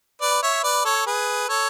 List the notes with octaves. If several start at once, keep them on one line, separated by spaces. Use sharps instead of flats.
B4 D5
C#5 E5
B4 D5
A4 C#5
G#4 B4
A4 C#5